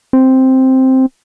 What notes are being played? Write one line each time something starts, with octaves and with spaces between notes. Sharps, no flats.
C4